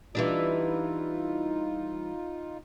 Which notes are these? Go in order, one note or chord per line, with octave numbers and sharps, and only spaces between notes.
E3 G3 D4 D#4 F4